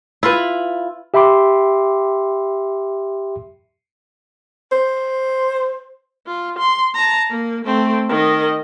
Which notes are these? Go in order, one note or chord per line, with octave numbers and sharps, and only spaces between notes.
E4 F4 B4
G4 E5 G5 B5 C6 D6
C5
F4
C6
A5 A#5
A#3
A3 C4
D#3 D#5